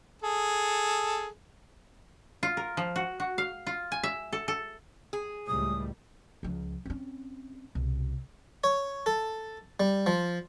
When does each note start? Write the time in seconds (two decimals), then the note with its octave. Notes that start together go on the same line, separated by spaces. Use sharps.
0.22 G#4 A4
2.43 F4
2.57 A#4
2.77 F3
2.96 F#4
3.20 F#4
3.38 F5
3.67 F4
3.92 G#5
4.03 E5
4.33 A4
4.48 A4
5.13 G#4
5.47 C#2 A2 G3 D#6
6.43 C#2 F3
6.86 C4 C#4
7.75 C2 B2
8.64 C#5
9.06 A4
9.80 G3
10.06 F3